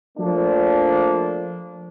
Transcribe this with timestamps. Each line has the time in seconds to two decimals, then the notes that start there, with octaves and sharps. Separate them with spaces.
0.18 F3 A3 A#3 D4